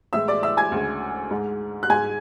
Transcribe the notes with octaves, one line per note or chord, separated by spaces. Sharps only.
A2 E3 G#3 E5 E6
D5 D6
E5 E6
G#5 G#6
D2 C#3 G#3
G#2 G#3
F#6
G#2 G#3 G#5 G#6